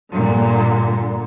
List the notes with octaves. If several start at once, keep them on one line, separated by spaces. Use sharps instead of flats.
G2 A#2 D3